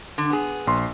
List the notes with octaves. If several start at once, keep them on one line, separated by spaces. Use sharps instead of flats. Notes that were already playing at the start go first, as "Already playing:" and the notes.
D3
B3 G#4
A#1 C6